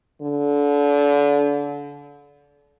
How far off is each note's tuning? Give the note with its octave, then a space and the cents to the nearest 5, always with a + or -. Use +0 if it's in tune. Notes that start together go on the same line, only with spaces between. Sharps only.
D3 -30